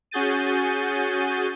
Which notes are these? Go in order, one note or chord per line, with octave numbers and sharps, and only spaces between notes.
C#4 F#4 G#4 G6 A6 D#7